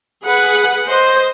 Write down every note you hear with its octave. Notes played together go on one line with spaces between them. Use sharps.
G#4 B4 F#5
C5 D#5